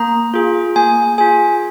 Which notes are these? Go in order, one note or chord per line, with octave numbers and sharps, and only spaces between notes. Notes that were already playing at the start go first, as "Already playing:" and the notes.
Already playing: A#3 A#5
F4 G#4
A#3 G#5
F4 G#4 G#5